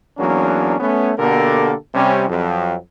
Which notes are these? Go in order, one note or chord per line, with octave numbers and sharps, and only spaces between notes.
E2 F#3 A#3 C#4 D4
A3 B3 C#4
B2 D3 A#3 G4 A4 A#4
C3 G3 C#4
F2 F#3